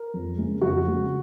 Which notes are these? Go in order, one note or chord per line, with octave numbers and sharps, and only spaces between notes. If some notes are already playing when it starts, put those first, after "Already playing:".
Already playing: A#4
F2
C#3 G#3
F2 F#4
C#3 G#3